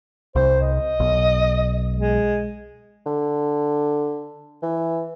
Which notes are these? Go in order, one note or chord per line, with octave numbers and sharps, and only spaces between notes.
C2 C5
D#5
B1
G#3
D3
E3